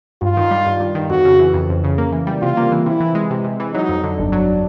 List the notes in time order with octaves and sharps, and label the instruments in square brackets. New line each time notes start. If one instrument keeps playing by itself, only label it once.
[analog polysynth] G2 [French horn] F4
[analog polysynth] D#3
G3
G2
G2
D#3
[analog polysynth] F2 [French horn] F#4
[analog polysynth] C#3
E3
F2
F2
C#3
A#3
E3
G3
[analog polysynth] C3 [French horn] F4
[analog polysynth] A#3
E3
[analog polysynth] C3 [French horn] E4
[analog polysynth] E3
G#3
C3
C3
E3
[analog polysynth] F#3 [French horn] D#4
[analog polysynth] F2
D3
[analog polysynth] G1 [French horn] D4
[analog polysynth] F#3